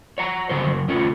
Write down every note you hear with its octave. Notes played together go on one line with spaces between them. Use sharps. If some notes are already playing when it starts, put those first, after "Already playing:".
C#5 F#5 A#5
C#3 F#3 C5
C#3 F#3
C3 A3 C#4 F4